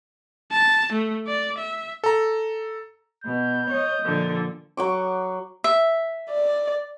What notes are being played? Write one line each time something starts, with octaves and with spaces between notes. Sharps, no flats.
A5
A3
D5
E5
A4 A#5
B2 G6
C#5 D#5
A#2 D3 F3
F#3 C#6 D6
E5
D5